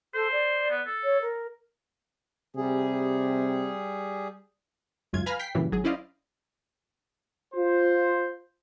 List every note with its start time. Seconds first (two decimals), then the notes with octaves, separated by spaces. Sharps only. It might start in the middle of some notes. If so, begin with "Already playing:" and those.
0.14 A4 C5
0.32 D5
0.70 B3
0.86 A4
1.03 C#5
1.21 A#4
2.56 C3 G3 G#4
5.13 G#1 C#2 F#2 F4 G#6
5.26 B4 F5 G#5 A#5 B5 F6
5.39 G5 B6 C7
5.55 G2 A#2 C#3 E3 F#3 G3
5.72 G#1 F#3 G#4
5.84 C#4 E4 C5 D5 D#5 F5
7.54 F4 C5